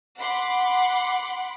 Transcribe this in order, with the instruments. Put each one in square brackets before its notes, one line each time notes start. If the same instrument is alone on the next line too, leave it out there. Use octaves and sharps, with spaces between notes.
[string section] F#5 B5 C6 D6